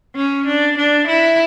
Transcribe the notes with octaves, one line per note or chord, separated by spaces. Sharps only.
C#4
D4
D4
E4